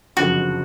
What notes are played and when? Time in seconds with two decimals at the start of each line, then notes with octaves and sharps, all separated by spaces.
0.17 F#1 F2 D3 F3 G#3 F#4